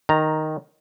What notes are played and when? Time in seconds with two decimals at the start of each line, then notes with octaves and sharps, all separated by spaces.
0.09 D#3 A#5